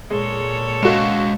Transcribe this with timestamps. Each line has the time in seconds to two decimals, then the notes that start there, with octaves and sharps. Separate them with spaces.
0.10 A#2 G#3 A4 C#5
0.83 G#3 F#4 D#5 F5 E7